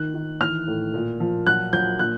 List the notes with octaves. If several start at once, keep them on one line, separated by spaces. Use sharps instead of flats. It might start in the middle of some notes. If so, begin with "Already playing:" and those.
Already playing: D#3 F#6
D#3
E3 F6
A2
A#2
F3
F#3 F#6
F#3 G6
A#2 F#6